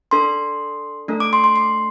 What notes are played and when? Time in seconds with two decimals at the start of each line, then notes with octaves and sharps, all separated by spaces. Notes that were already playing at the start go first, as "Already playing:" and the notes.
0.11 D4 A4 C6
1.08 A3 D4 A4
1.20 D6
1.33 C6
1.44 C6
1.56 C6